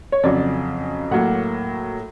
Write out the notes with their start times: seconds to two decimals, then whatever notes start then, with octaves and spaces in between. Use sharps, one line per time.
0.12 C#5
0.23 F2 C#3 F#3 D5
1.11 A2 F#3 A#3 F#5